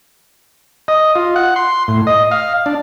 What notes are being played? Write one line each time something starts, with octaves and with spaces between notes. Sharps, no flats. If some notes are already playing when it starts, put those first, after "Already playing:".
D#5
F4
F#5
C6
A2
D#5
F5
D4